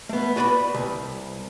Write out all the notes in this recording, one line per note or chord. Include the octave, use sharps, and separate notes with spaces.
A3 B3
F#4 B4 D5 A#5 B5
C2